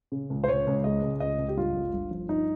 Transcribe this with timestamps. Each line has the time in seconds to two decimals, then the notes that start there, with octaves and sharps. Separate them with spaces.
0.12 C#3
0.30 C#2
0.44 C5
0.48 C#2 C#5
0.67 C#2
0.84 G#3 D#5
1.02 C#2
1.20 C#2 D#5
1.39 C#2
1.48 G4
1.57 G2 F4
1.75 G1
1.93 G1
2.11 F3
2.29 G2 D#4